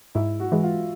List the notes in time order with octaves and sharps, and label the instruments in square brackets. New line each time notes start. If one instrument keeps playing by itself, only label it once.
[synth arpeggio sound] G#2 [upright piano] E4
[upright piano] F#4
[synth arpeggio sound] E3 G#3
[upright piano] F4